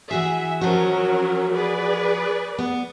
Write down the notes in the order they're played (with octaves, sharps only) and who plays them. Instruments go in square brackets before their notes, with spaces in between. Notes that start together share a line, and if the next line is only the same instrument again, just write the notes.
[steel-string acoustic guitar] E3 F#4 G#4 [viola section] E5
[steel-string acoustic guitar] F3 F#4 [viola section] F#3 C#4 A#4
[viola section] G#4 B4 D5
[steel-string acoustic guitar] B3